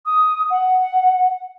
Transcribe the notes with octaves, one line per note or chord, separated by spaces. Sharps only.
D#6
F#5